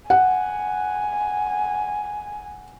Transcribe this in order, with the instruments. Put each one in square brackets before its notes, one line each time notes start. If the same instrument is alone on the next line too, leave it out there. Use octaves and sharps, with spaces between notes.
[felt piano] F#5 [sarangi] G#5